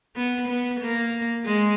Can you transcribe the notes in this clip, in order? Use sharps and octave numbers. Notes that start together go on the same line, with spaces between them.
B3
B3
A#3
G#3